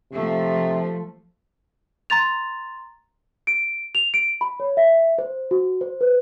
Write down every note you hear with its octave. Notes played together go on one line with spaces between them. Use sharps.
C3 F3 A3
A#5 C6 A6 F7
D7
F7
D7
B5
C#5
E5
C5
F#4
C5
B4